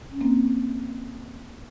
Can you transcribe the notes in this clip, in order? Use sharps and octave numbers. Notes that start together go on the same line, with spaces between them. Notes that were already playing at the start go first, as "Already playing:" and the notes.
Already playing: B2
C#4
A#3 C4